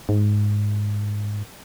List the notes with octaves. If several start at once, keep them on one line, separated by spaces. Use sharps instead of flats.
G#2